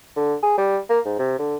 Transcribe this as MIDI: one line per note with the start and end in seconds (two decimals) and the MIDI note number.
0.16 0.34 50
0.43 0.57 68
0.58 0.78 55
0.89 0.99 58
1.06 1.17 44
1.19 1.36 48
1.39 1.56 50